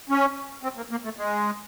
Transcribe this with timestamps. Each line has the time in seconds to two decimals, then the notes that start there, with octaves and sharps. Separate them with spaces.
0.10 C#4
0.63 C4
0.77 A#3
0.91 A#3
1.04 A3
1.18 G#3